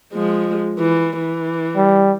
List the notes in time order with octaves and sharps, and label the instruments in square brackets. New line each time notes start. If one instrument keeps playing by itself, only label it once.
[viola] F3 G#3
E3
E3
[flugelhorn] G3